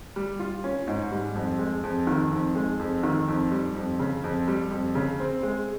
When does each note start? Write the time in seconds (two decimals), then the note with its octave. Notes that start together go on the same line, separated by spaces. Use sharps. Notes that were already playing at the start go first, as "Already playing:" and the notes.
0.16 G3
0.39 F4
0.64 C#4
0.87 G#2
1.12 G3
1.35 F2
1.59 G#3
1.84 F2
2.07 D#3
2.32 F2
2.55 G#3
2.79 F2
3.03 D#3
3.28 F2
3.51 G3
3.75 F2
4.00 C#3
4.24 F2
4.48 G3
4.71 F2
4.95 C#3
5.20 C4
5.43 G#3